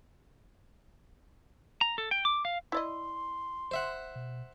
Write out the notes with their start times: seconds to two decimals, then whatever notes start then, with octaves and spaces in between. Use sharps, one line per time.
1.81 A#5
1.98 A4
2.11 G5
2.25 D6
2.45 F5
2.72 E4 D5 D#5 C6
3.71 D#1 C5 E5 F#5
4.15 B2